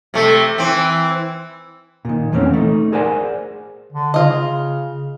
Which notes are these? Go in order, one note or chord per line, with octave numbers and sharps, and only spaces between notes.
C3 A3
E3 C4
A#2 D#3
E2 E3 A3 C4 C#4
A3 D#4
G#4 A#4 C5 D5 F#5 G#5
D3
C#3 F4 D#5